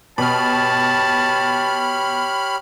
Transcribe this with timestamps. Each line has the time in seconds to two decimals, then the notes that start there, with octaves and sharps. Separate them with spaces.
0.18 B2 G4 C#5 A5 B5 F6